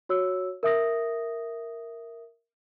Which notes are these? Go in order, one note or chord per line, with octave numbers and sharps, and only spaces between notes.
F#4 C#5 E6
A#4 E5 D#6 A#6